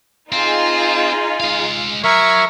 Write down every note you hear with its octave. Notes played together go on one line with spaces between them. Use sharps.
C4 D#4 F4 G#4
G#3 F5
F#3 A#4 E5 C#6 G#6